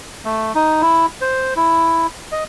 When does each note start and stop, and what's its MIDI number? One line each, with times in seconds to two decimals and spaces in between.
0.25 0.52 57
0.55 0.82 63
0.82 1.06 64
1.21 1.54 72
1.56 2.07 64
2.32 2.44 75